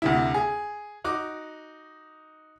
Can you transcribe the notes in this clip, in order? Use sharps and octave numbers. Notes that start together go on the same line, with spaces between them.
D2 C3 E4
G#4
D#4 F#4 D6